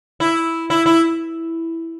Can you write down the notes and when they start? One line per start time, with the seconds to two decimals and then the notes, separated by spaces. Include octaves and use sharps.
0.20 E4
0.70 E4
0.86 E4